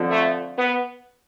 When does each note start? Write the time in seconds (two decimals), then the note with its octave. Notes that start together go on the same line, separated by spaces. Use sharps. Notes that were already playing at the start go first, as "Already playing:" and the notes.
Already playing: F2 D3 F3
0.10 A3
0.57 B3